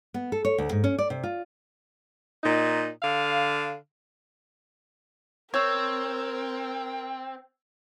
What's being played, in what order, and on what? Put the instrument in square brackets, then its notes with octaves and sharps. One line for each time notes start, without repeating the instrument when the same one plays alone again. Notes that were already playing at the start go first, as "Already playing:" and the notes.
[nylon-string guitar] B3
A4
C#5
D2
G#2
C#4
D5
C3
F4
[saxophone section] A#2 D#4
D3 F5
[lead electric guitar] C4 [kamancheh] A#4 [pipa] C#5 [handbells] E6 G6 G#6